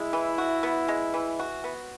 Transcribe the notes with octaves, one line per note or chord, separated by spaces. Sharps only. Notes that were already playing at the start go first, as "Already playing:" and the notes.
Already playing: G#3 E4
E3
F#4
B3
G#3
E3
F#4
B3